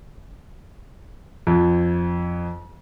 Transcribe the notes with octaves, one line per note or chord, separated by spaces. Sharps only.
F2